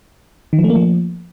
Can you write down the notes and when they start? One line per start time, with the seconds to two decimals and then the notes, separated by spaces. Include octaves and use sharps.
0.53 D#3
0.58 F3
0.64 A3
0.70 A#3
0.75 F3